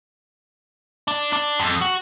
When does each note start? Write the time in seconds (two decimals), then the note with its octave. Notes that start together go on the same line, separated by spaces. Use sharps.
1.08 D4
1.33 D4
1.60 F2
1.82 F#4